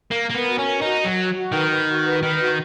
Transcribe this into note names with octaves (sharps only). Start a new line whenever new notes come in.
A#3 A#4
A#3 A#4
B3
F#4
C#4
A#4
D#4 F#4
F#4
F#3
F#4
F#4
D#3 B4
B4
F#4
B4
D#3 B4
F#4